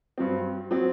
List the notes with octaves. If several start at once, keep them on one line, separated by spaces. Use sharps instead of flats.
G2 F#3 C4
F#3 C4